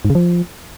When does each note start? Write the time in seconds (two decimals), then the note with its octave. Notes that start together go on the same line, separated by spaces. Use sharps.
0.05 G#2
0.10 C#3
0.15 F3